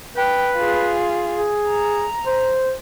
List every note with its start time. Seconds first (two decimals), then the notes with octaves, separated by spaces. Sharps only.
0.16 B4 G5
0.56 F4 G#4
1.36 G#4
1.69 A#5
2.26 C5